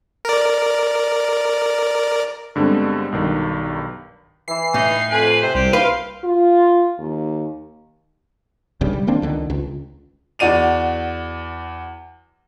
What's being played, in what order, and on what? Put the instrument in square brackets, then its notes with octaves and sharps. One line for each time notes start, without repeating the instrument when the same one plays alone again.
[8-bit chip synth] A#4 D5
[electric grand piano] G2 D3 G3 G#3 B3 C4
B1 G2 D#3
[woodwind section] E3 [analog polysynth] C7
[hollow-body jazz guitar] A2 [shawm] D#4
[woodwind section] F2 G#5 [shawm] B4
[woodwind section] C3 [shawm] C5
[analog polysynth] C2 [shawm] G4
[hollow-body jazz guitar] B4 [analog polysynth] F5 [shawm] C6
[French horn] F4
D#2
[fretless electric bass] B1 G2 C#3 G3
G3
D#3 A#3 C4 D4
C#2 D3 D#3
C#2
[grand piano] E2 F#4 D5 D#7 F7